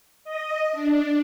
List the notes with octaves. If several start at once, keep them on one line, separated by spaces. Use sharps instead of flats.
D#5
D4